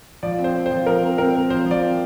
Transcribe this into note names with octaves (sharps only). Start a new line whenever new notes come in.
F3 D5
C4
C5
C4
C5
F3
F3 A#4
C4
C4 A#4
C4
F3 C5
F3
D5
C4